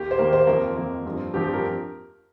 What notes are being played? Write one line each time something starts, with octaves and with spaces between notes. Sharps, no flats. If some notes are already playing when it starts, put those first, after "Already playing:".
Already playing: D#2 A#3 G4
C5
D#2 D#3 A#3 A#4
C5
F2 F3 A#3 A#4
F2 F3 A#3
G2 F3 C4
G2 F3 C4 G4
G4
A#4